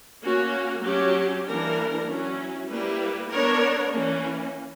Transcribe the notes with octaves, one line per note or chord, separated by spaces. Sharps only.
A#3 C#4 F#4
F#3 C#4 G4
E3 G3 A#3 D4 A#4
F#3 C#4 E4
G3 A#3 E4 G4 B4
B3 D4 A#4 C#5
E3 A#3 C#4